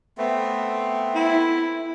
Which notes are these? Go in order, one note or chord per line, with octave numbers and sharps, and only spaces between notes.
A3 B3 C4
E4